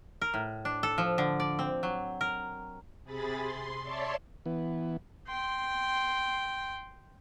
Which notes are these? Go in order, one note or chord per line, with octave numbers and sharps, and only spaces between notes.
A#4
A2
D4
A4
F3
D3
D5
C4
F#3
A#4
C3 G#4 B5 A6
C6
C#5 D5 E5 A5 C6
E3 B3
G5 C6